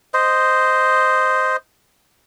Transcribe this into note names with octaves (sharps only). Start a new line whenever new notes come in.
C5 D#5